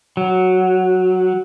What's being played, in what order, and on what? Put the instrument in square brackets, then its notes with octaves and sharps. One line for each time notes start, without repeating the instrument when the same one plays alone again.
[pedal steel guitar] F#3